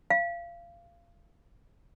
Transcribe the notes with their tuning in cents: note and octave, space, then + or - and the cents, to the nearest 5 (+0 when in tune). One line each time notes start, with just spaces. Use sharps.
F5 -25